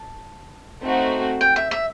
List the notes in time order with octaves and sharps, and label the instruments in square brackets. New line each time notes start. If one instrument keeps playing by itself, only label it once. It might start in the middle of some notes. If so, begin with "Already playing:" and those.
Already playing: [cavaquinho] A5
[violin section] A3 C4 D#4 F#4
[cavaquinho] G5
E5
E5